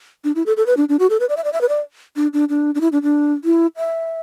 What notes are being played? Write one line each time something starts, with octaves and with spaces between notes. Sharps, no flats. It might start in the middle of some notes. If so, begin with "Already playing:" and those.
D4
E4
A4
A4
B4
D4
D4
F#4
A4
B4
D5
E5
D5
E5
B4
D5
D4
D4
D4
D4
E4
D4
D4
E4
E5